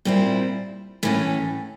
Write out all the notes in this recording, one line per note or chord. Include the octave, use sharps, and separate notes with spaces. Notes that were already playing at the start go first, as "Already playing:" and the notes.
A#2 G3 C4 E4
A2 E3 A3 C#4